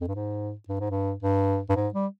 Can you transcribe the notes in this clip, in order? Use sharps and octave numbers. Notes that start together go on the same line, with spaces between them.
F2
G2
G#2
G2
G#2
G2
G2
G2
G#2
G3